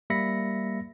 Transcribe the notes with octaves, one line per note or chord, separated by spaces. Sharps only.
G3 A#3 E5 B5 A#6 C#7